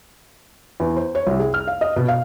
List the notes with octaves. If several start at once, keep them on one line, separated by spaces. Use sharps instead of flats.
E2
C5
C#5
C2
G#4
F6
F5
D#5
B2
F5